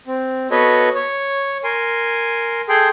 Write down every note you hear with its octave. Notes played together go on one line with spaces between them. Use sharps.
C4
B3 F#4 A4 B4 C#5 D#5
C#5
A#4 G#5 C6
G#4 A4 G5 C6